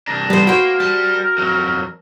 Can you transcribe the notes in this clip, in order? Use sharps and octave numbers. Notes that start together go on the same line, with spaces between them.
C2 D4 A#5
G3 B3 C5
A#3 F#4 A#4 C5 G5
G3 A5
F2 F#3